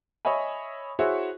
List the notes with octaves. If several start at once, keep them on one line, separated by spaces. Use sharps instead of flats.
C#5 D#5 E5 G#5 B5
E4 F#4 G#4 C5 C#5 E5